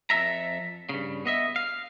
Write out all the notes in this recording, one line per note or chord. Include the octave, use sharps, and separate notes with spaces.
F2 G#2 A4 E5 A#5
G2 C#3
B3 D#5 E5
F5